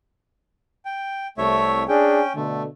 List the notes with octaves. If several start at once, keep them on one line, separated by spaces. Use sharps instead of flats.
G5
C2 A3 C#5 E5
C#4 D4 G#4 G5
B2 D3 A3